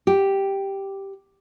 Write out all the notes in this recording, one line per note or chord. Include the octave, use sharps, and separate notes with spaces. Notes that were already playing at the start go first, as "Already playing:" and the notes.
G4